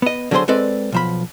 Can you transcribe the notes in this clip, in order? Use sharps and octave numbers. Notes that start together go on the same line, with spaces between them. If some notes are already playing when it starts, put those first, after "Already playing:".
B3 D#5
D3 F#3 F#4 G#4 C5 C6
G#3 C4 A4 B4 D5
B1 F3 B5